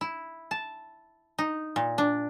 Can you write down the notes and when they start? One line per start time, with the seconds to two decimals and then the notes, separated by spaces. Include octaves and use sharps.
0.01 E4
0.51 A5
1.39 D#4
1.76 A#2
1.98 D4